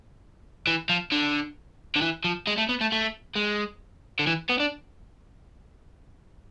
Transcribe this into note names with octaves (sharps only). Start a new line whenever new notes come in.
E3
F3
D3
D3
E3
F3
G#3
A3
B3
A3
A3
G#3
D3
E3
B3
D4